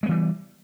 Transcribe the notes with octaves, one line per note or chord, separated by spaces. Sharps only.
E3 G3 G#3 B3